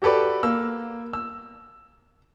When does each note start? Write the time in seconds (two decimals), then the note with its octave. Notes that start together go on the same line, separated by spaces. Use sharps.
0.02 F#4 G4 A4 B4 D5
0.43 A#3 E6
1.13 E6